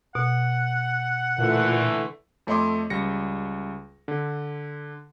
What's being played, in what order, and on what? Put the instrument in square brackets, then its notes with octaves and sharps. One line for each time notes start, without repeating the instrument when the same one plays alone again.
[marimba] B2 [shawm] F#5
[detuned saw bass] A#2 [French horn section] D3 E3 A3
[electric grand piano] F2 A3 C#5 D#5 C6 D6
C#2 G3 A#6 C#7
D3